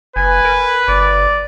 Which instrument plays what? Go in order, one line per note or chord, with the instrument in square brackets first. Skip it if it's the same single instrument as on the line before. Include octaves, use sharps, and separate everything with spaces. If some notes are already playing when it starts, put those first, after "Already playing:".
[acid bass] F#1 [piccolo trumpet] B4 [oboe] G#5
[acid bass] A#4
[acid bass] G1 [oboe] D5